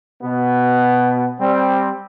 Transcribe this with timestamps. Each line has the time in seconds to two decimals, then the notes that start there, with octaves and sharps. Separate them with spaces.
0.23 B2 B3
1.40 G3 C4